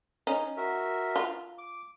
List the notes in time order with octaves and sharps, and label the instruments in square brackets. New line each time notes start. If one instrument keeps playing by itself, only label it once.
[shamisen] C#4 D#4
[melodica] F#4 A#4 E5
[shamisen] F4
[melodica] D6